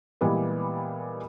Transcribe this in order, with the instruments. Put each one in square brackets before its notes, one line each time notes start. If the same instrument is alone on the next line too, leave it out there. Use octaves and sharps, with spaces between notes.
[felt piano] A#2 E3 G3 G#3 B3